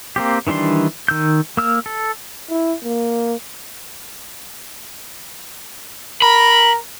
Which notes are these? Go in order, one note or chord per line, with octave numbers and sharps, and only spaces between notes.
A#3 C4 G4
D#3 E3 G3 D4 C6
D#3 E6 G6
A#3 E6 F6
A4
E4
A#3
A#4 B5